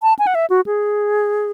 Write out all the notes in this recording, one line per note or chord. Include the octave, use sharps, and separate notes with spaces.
A5
G#5
F#5
E5
F#4
G#4